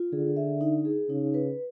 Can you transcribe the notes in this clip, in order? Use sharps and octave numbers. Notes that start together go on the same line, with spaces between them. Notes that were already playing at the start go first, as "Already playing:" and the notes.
Already playing: F4
D3 G#4
E5
D#4
G#4
C#3 D#4
B4